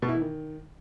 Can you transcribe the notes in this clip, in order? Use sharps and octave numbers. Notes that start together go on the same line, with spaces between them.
B2
E4
E3
D#3